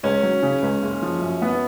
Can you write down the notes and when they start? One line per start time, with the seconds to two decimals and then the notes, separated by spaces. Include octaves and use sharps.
0.03 C#2 C#4
0.23 F#3
0.42 C#3
0.62 C#2
0.82 F#1
1.02 F3
1.22 F#2
1.42 B3